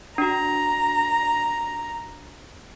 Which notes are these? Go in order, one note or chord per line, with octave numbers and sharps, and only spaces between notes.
D4 F#4 A#5